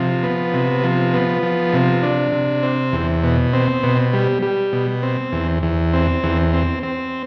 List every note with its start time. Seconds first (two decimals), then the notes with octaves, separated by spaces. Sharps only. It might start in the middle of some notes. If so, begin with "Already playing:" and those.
Already playing: C3 F3
0.23 B3
0.54 C3
0.83 F3
1.14 B3
1.43 F3
1.73 C3
2.03 D4
2.32 C3
2.63 C4
2.92 E2
3.23 B2
3.53 C4
3.83 B2
4.13 G3
4.42 G3
4.73 B2
5.03 C4
5.32 E2
5.63 E2
5.93 C4
6.24 E2
6.53 C4
6.83 C4